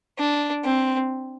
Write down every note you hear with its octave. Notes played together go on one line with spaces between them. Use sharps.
D4
C4